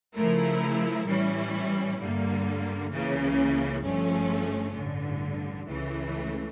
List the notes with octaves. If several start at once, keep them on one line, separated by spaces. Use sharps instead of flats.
C#3 F3 A3 E4 A#4
A2 E3 G3 C#4 E4
G2 D3 G3 A#3
C#2 C#3 E3 A#3 C#4
G1 G2 F3 A3 C#4
A1 G2 D3
C#2 C#3 E3 A3